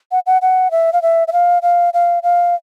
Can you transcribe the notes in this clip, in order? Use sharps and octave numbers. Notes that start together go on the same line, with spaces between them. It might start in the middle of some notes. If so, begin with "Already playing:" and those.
F#5
F#5
F#5
E5
F5
E5
E5
F5
F5
F5
F5